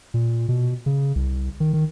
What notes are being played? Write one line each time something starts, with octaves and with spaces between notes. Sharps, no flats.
A#2
B2
C#3
C2
D#3
D#3